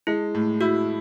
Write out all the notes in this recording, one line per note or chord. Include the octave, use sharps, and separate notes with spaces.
G#3 E4
A2
E4 F#4